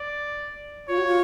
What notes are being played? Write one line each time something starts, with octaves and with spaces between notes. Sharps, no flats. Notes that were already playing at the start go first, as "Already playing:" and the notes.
Already playing: D5
F4 C#5
F#4
F4